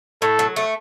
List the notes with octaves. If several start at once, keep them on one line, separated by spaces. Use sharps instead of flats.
A2 A4
F#3
A3